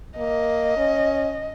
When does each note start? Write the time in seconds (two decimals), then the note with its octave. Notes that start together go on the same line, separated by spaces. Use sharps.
0.18 A#3 D#5
0.77 C#4